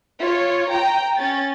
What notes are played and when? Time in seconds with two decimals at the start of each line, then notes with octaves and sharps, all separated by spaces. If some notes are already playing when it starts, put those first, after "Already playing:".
0.19 F4 C#5
0.69 G5 A#5
1.17 C#4 A6